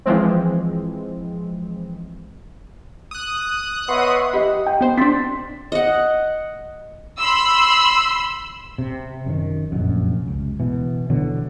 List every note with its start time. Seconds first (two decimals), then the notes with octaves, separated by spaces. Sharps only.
0.06 E3 F3 G#3 C4
3.11 D#6 F#6
3.89 B3 C#5 D#5 E5 F#5 C6 C#6
4.33 G4 D#5 B5
4.66 G5
4.81 B3 C5
4.97 C4 D4 C6 A6 B6
5.72 D#5 F#5
7.20 B5 C6 E6
8.78 C3
9.26 F#2 D#3
9.72 F1 A#1 F#2
10.28 C#2
10.60 B2 E3
11.10 B2 D3 E3 F#3